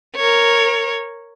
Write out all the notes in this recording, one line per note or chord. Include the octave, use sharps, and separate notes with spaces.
A#4 C#5